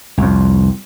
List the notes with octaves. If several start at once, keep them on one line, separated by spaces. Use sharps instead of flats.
C2 F2